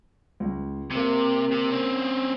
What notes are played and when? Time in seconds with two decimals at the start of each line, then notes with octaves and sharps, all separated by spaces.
0.40 C#2
0.91 C3 A#3 C#7
1.52 C3
1.71 C4 C#4